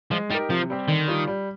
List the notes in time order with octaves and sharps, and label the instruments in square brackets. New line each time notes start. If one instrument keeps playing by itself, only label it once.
[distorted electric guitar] F3 [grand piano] G#3
[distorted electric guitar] G3 [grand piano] D#4 G4 A#4
[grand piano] C3 [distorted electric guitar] F3
[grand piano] G3 C4 G4
[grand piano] D3 [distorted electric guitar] D#3
[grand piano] G3 D4 F4
G3